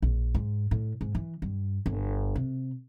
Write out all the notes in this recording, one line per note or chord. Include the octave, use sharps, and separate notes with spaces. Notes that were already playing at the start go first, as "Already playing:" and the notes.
A#1
G#2
A2
G#2
E3
G2
G1
C3